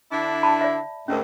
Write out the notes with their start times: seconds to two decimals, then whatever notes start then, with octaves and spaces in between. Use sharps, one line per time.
0.12 D3 D4 E4
0.43 A5 B5
0.61 D5 E5
1.08 D2 G#2 C#4 A#4